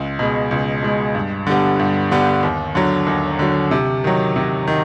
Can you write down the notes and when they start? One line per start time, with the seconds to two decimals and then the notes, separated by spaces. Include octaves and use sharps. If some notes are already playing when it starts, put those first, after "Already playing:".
Already playing: C#2
0.19 B2 G#3
0.51 C#2
0.83 B2 G#3
1.15 G2
1.47 D3 G3 B3
1.79 G2
2.11 D3 G3 B3
2.43 D#2
2.75 D3 F#3
3.07 D#2
3.39 D3 F#3
3.71 C3
4.04 D#3 F#3
4.36 C3
4.68 D#3